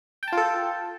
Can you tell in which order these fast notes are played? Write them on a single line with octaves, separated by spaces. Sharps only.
G5 A5 F4 A4